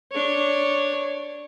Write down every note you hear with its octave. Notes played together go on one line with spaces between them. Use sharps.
D4 C#5